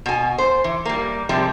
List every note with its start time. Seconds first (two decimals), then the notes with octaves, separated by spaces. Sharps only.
0.06 B2 G#5
0.38 C5
0.64 E3
0.85 G3 A#3
1.29 C3 F3 G3 G#3